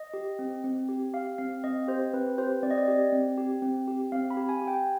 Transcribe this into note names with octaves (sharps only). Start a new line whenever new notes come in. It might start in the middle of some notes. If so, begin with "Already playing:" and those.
Already playing: D#5
G4
C4
C4
G4
G4 F5
C4 F5
C4 D#5
G4 C5
C4 B4
G4 C5
C4 D5
D#5
D5
G4
C4
G4
C4
G4
C4 F5
B5
G4
G#5
G4
G5